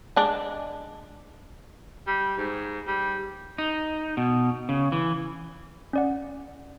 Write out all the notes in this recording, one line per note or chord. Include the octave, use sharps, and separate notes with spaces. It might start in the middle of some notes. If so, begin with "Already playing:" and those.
G#3 D4
G3
G#2
G3
D#4
B2
C#3
E3
C#4 D5 F#5